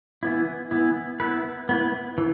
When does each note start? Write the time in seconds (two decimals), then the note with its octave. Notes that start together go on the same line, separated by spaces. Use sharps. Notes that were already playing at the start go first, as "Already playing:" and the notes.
0.23 E3 B3 E4
0.71 E3 B3 E4
1.20 B3 E4 B4
1.69 B3 E4 B4
2.18 E3